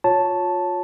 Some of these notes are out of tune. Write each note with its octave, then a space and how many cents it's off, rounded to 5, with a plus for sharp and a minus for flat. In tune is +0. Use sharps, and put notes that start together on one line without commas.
F4 +30 C#5 +0 A5 +0